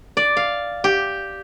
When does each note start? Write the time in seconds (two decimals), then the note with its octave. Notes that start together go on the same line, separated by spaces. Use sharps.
0.17 D5
0.37 F5
0.84 G4